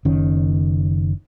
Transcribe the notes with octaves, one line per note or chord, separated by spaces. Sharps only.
F#1 D#3 C#4